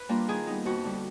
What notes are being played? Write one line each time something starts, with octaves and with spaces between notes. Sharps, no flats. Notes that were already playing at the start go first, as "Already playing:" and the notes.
Already playing: B4
G3 A#3 D4 F4
D#3 G#4
G3 B3 D#4
F2 F#4
D3 G3